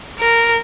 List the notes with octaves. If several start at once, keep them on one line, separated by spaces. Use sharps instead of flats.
A#4